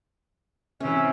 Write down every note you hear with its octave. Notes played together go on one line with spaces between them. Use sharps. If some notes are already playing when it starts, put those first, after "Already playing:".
C3 E3 C#4 E5